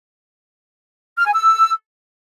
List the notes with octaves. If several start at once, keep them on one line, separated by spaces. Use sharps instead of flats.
F6
G#5
E6